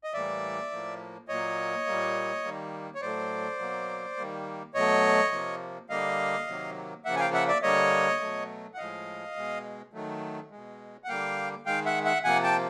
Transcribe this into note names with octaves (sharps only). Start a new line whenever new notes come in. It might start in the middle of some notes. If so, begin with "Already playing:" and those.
D#5
A2 E3 G3 A#3 D5 E5
A2 F3 A#3
A#2 F#3 A#3 C#5 D#5
A#2 G3 A#3
D#3 G3 A#3
C#5
A2 F#3 A3 C5 D5
B2 F#3 A#3
D#3 G3 A#3
B2 F#3 A3 C#5 D#5
C3 F3 A#3
D3 G3 A#3 D#5 F5
C3 D#3 F#3 A#3
C#3 F3 A#3 E5 F#5
G#5
F5 G5
E5 F#5
D5 E5
D3 G3 A#3 C#5 D#5
B2 F#3 A3
F#5
A2 F3 G#3 D#5 F5
B2 G#3
D#3 F#3 A3
B2 G#3
F#5
D3 G3 A#3 F5 G5
D#3 G#3 F5 G5
E5 F#5
E5 F#5
C3 F3 A#3 F#5 G#5
G5 A5